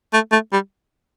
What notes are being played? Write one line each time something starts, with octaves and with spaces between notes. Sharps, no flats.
A3
A3
G3